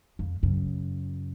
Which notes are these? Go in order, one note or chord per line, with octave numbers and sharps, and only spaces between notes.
F2
F#2 C#3